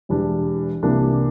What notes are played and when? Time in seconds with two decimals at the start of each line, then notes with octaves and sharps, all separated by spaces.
0.09 E1 E2 E3 G3 D4
0.83 C2 C3 E3 A#3 D4